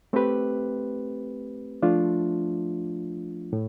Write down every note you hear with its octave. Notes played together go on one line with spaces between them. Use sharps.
A3 C4 G4 B4
F3 A3 D4 F4
A2